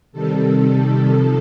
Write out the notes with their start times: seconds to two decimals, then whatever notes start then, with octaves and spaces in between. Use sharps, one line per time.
0.12 C3 D#3 G3 A4
1.09 C3 F3 A4